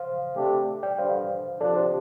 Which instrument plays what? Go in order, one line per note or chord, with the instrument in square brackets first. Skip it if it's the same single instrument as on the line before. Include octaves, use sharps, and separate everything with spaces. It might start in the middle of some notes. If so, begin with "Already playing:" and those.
Already playing: [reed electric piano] C5 F5
[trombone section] C3 A3 D4 G4
[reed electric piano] D5 G5
[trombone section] G2 D3 G3 [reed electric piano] C5 F5
[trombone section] C3 F3 D4 [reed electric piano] A4 D5
[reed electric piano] G4 C5